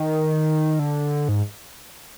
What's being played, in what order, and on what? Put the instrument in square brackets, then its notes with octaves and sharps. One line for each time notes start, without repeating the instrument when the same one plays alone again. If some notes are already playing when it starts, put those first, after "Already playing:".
Already playing: [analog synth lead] D#3
D3
G#2